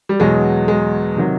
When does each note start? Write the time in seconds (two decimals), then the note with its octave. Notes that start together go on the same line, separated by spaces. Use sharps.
0.09 G3
0.20 E2 B2 F#3 G#3
0.68 G#3
1.17 C3 D#3 F#3